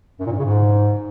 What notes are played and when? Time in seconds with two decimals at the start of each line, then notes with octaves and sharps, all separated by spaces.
0.19 F#2
0.26 A#2
0.32 G#2
0.38 C#3
0.45 G#2